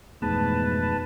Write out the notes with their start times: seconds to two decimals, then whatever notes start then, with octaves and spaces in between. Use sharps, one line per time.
0.22 F2 G#2 B2 E3 A3 B3 B4 A5